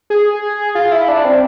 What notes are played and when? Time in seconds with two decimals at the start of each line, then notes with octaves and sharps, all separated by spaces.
0.10 G#4
0.75 F4
0.92 E4
1.08 D4
1.25 C4